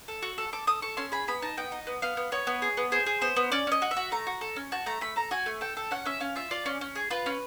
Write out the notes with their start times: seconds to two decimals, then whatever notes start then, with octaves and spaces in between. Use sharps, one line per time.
0.08 A4
0.22 F#4
0.38 A4
0.53 A4 D6
0.67 A4 D#6
0.82 A4 C#6
0.97 C#4 C6
1.12 G#4 B5
1.28 B3 B5
1.42 D#4 A5
1.57 B3 G5
1.72 D#4
1.87 B3
2.02 B3 F5
2.17 B3
2.32 B3 C#5
2.47 B3
2.62 G#4
2.77 B3
2.92 G#4 C5
3.06 G#4
3.21 B3 C5
3.36 B3
3.52 C#4 D5
3.67 C#4 D#5
3.82 F#4
3.91 E5
3.97 F#4
4.12 A3 A#5
4.27 F#4
4.41 A4
4.56 C#4
4.72 F#4 A5
4.86 A3 A#5
5.01 A3 B5
5.16 A4 A#5
5.31 F#4 G#5
5.46 A3
5.61 A4 G5
5.77 A4
5.91 C#4 F#5
6.05 C#4 E5
6.20 C#4 F5
6.36 F4 E5
6.51 F4 D5
6.66 C#4
6.81 C#4
6.95 G#4
7.10 F4 B4
7.26 C#4